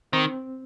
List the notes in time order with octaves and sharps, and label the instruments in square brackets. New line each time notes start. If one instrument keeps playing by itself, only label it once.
[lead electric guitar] D#3 [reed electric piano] C4